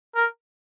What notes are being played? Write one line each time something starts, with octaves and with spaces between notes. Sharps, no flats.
A#4